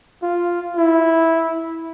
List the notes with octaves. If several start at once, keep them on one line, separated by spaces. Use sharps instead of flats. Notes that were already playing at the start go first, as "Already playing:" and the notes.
F4
E4